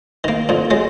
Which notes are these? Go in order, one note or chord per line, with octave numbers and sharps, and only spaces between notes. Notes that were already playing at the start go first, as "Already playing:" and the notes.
D#3 A#3
F2 A#2
F#3 G#3